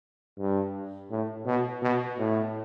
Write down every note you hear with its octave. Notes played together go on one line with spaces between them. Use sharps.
G2
A2
B2
B2
A2